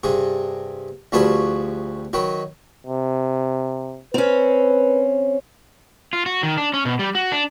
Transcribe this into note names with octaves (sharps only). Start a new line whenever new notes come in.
G2 C3 G#4
D2 F3 G3 F#4 G#4 B4
D#3 F#3 B4
C3
C4 C#4 B4
F4
F#4
D#3
D4
C#4
B2
G3
F#4
D4